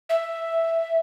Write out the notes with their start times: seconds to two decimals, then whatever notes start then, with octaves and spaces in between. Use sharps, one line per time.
0.09 E5